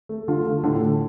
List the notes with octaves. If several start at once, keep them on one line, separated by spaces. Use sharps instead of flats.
A3
D3 F4
A3
A2 D3
A2